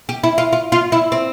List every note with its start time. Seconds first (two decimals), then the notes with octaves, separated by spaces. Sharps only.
0.09 G4
0.24 E4
0.38 F4
0.53 F4
0.72 F4
0.92 E4
1.12 C4